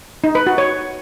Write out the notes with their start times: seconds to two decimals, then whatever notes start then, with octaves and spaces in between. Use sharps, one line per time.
0.24 D#4
0.35 B4
0.47 F#4
0.58 C#5